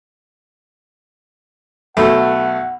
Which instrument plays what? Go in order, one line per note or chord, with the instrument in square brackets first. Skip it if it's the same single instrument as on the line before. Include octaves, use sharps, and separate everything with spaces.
[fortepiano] B1 A3 [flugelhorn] F#5